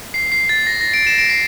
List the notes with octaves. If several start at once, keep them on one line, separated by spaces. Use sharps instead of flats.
C7
C7
A6
A#6
A#6
D7
E7
D7
C7